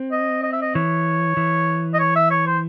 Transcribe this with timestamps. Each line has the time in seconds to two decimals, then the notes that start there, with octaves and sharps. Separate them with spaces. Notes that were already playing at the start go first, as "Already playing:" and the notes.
Already playing: C4
0.12 D#5
0.43 D#5
0.53 E5
0.62 D#5
0.75 E3 C#5
1.37 E3
1.94 D#5
1.99 C#5
2.16 E5
2.31 C#5
2.47 C5